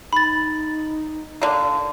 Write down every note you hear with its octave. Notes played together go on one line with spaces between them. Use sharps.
D#4 B5 A6
D3 A#3